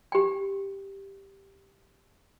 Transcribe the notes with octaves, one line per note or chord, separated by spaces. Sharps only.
G4 G5